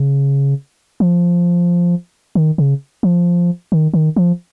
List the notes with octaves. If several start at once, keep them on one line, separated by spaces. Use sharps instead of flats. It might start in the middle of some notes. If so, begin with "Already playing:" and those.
Already playing: C#3
F3
D#3
C#3
F3
D#3
D#3
F3